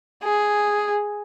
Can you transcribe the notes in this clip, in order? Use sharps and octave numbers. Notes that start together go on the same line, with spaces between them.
G#4